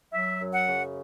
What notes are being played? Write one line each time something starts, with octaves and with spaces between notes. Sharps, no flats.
F#3 E5
F#2
F#5
C#3